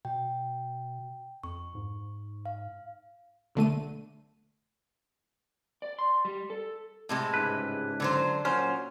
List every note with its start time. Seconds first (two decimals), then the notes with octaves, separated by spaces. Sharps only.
0.05 B2 G5
1.44 F2 C#6
1.75 G#2
2.46 F5
3.55 B1 D3 A3 D#7
5.82 D5
5.99 C6
6.25 G3
6.50 A4
7.09 A2 C3 G#3
7.34 C#2 G#2 B4
8.00 D3 F#3 C5
8.45 A#2 F#3 C#4 C5